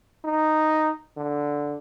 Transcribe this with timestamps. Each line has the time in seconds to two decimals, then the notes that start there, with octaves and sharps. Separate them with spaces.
0.25 D#4
1.17 D3